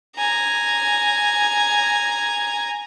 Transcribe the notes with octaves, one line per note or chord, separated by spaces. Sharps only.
G#5 A#5